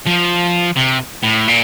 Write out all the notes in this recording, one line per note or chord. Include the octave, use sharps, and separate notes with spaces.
F3
C3
A2
A#2